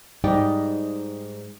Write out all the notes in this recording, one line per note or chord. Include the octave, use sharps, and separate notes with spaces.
G#2 G3 D#4 D5 G5